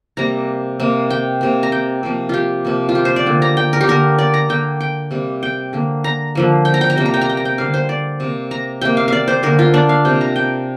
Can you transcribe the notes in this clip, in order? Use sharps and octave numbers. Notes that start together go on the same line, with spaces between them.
C3 G3 A#3 A#5
C3 A#3
G5
C3 A#3
A#5
G5
C3 F3 A#3
F4 G4
C3 F3 A#3
F4
G4
C5
D5
D3 A#3
A#5
G5
A#4
G4
D3 A#3 A#4
D5
A#5
D3 A#3 G5
G5
C3 G3 A#3
G5
D3 A#3
A#5
D3 F3 A#3
G5
A#5
G5
A#5
C3 G3 A#3 G5
A#5
G5
A#5
G5
A#5
G5
D3 G3 A#3 F5
C5
D5
C3 A#3
A#5
C3 A#3 G5
F5
D5 F5
C5
D3 A#3 A#4
F4
D4
F5
C3 A#3 G5
A#5
G5